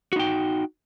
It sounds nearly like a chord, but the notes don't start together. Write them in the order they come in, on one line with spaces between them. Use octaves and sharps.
F#4 D#4 G5